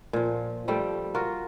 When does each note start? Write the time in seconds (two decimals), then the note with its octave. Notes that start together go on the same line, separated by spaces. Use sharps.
0.13 A#2 F3
0.68 F3 G3 A3 G5
1.15 F4 F#4 A#4